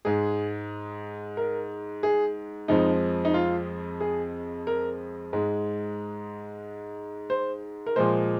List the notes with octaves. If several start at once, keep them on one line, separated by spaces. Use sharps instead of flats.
G#2 G#3 G#4
A#4
G#4
F2 F3 G#3 D#4
D#4
F4
G#4
A#4
G#2 G#3
C5
A#4
A#2 F3 G#3 C5